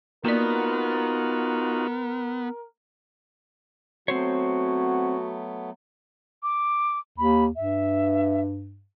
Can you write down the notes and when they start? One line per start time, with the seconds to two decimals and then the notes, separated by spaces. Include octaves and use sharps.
0.25 A#3 B3 D#4 F4 F#4 A#4 D5
4.08 F#3 A3 B3 C4 F#4 C5 C#5
6.43 D6
7.18 D#2 B5
7.56 G2 E5